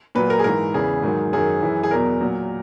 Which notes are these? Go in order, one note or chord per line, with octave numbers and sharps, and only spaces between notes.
A#2 F#3 B4
A#4
G#4
G#2 E3 A#4
E2 C#3 E3 G#4
G#2 D#3 F#3
F#2 D#3 F#3 G#4
F#2 E3
G#4
E2 B2 F#3 A#4
A#2 F#3